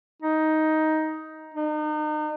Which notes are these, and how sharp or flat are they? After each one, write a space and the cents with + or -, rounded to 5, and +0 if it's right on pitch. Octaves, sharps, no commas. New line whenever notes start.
D#4 +10
D#4 -35